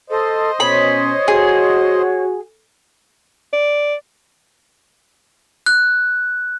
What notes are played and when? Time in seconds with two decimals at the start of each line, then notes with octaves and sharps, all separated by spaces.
0.10 A4 C5 D#5
0.60 B2 C#4 C#5 B5
1.28 F#4 G#4
3.53 D5
5.66 F#6